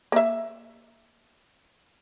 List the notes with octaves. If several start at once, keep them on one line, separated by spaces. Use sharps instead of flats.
A#3 E5